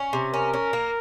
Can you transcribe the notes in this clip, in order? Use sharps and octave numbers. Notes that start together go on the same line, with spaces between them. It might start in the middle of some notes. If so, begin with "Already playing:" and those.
Already playing: C#4
C3
C#4 A#4
C#4
A#3